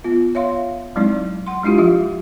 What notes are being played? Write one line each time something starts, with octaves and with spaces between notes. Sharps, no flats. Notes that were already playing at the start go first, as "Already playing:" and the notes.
B3 F4
C#5 E5 F5 C6
F#3 G#3 C4 D#4 E4 D5
F#5 C6
G#3 D4 E4 F4 G4 F5
F3 F4 E5